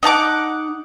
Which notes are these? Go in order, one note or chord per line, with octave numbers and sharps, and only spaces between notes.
D#4 F#5 A5 D6